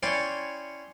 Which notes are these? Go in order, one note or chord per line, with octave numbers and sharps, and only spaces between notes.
C#4 E4 C#5 D5 G5 C6